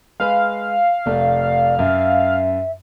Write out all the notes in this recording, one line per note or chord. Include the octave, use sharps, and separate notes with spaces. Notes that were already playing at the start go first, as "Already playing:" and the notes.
G#3 G#4 B4 F5
F1 A3 D5
F#2 E5